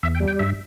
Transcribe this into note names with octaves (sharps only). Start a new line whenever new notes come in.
E2 E5
G5
G3
G5
G2 E5